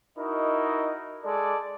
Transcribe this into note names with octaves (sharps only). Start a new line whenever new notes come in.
D#4 E4 F#4 A#4 D#5
G#3 A4 D5